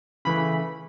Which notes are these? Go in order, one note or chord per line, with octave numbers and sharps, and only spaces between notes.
C#3 E3 A3 B5